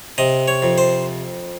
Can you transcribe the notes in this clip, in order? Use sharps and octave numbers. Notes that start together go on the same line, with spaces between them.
C3 D#5
C#5
F2
C5